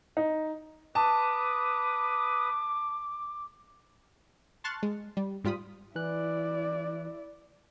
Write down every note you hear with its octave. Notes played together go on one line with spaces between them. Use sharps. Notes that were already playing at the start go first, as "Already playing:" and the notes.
D#4
B4 A5 D6 D#6
A5 C6 C#6 F6 F#6 A6
G#3
G3
G#2 G3 F4 B5 D#6
E3 E4 D5 F#6